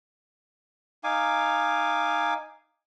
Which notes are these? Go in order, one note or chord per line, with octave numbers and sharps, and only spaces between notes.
D#4 F5 G#5 D6